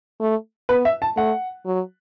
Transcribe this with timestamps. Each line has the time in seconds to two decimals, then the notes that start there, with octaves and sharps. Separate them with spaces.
0.21 A3
0.69 B3 B4
0.85 E5
1.02 A5
1.17 A3 F#5
1.66 F#3